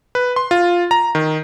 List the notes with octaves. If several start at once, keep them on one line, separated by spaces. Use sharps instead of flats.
B4
C6
F4
A#5
D#3